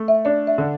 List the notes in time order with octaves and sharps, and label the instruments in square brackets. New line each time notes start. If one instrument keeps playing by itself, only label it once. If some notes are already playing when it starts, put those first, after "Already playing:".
Already playing: [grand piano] A3
[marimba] E5
[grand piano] D4 [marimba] D5
[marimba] E5
[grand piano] D3